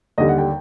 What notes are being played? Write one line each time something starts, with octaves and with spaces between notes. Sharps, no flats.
D#2 D3 G3 D#5
F#5
G5